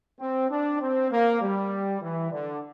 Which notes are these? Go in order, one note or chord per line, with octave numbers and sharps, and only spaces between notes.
C4
D4
C4
A#3
G3
E3
D3